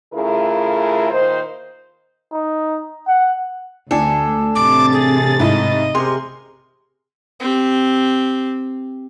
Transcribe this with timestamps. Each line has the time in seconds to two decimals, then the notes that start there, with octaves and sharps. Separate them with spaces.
0.14 C#3 A3 E4 F4 G#4 A#4
1.10 A#2 D#3 D#4 C5
2.33 D#4
3.08 F#5
3.91 D2 D4 A4 G#5
4.55 A1 C3 D6 A6
4.93 G#4
5.40 G#2 E4 D#5
5.95 C3 G#4 A#4 C6
7.40 C4 G4